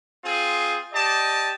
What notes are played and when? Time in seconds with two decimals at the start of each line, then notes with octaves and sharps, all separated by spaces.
0.24 C4 F4 G#4
0.93 G4 D5 D#5 A5